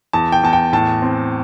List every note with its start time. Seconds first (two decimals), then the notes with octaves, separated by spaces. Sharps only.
0.13 E2 A5
0.32 G5
0.43 E2 A5
0.53 G5
0.73 A2 A5
1.02 C4